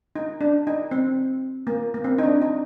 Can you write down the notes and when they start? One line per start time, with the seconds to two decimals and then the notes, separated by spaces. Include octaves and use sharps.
0.16 D#4
0.41 D4
0.67 D#4
0.91 C4
1.67 A#3
1.94 A#3
2.04 C4
2.19 D#4
2.23 D4
2.42 D#4